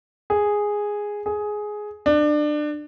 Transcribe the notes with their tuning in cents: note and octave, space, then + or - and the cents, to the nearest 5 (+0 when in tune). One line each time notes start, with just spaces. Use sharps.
G#4 -5
G#4 +10
D4 +25